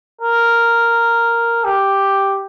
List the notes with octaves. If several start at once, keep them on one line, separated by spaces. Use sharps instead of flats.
A#4
G4